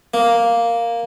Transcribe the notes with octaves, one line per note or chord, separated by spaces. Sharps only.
A#3